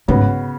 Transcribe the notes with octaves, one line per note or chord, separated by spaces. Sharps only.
G#2 C#3 B3 F#4 B4